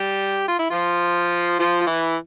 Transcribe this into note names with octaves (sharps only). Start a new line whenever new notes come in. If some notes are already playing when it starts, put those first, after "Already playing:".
Already playing: G3 G4
F4
E4
F3 F4
F3 F4
F4
E3 E4